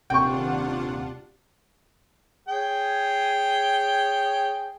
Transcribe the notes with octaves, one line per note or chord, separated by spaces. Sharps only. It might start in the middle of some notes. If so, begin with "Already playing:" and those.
D#1 C3 D4 F4 F#5 G5 C#6
G#4 C#5 G5